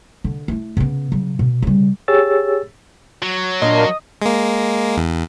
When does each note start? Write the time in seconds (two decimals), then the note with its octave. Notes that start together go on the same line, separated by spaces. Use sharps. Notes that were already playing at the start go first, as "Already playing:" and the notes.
0.24 D3
0.48 A3 E4
0.77 C#3 B3
1.12 C#3 F#3
1.39 B2
1.62 C#3 G3
2.08 G4 G#4 C#5 E6 A6
3.22 F#3
3.62 A#2 A#3 D4 D#5 C6
4.22 G#3 A#3
4.97 E2